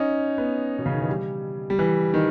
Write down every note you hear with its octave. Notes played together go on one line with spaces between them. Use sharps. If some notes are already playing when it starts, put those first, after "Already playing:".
Already playing: C#4 D#4
B3
B2
C#3
D#3
E3
G3
G3
E3
D#3